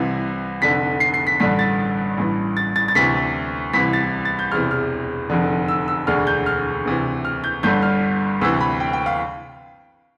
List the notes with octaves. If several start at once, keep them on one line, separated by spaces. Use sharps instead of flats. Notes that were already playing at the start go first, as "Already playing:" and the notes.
Already playing: C2 C3 E3
F1 F2 D3 B6
C7
C7
B6
A1 G2 D3 B6
A6
A1 G2 E3
A6
A6
A6
D2 C3 E3 B6
C2 C3 E3 B6
A6
A6
G6
E1 E2 C3 E3 F6
F6
F1 F2 D3
E6
E6
E1 D2 D3 F6
G6
F6
D2 C3 E3
F6
G6
G1 G2 D3 G6
F6
D2 C3 E3 E6
B5
G5
G5
F5